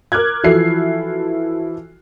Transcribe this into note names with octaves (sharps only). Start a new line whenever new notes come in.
A#4 D6 F6 F#6 G#6
E3 F3 E4 F#4 A4 C7